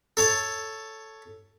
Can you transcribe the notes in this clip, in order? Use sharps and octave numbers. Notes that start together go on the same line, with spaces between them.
A4 C#5 A5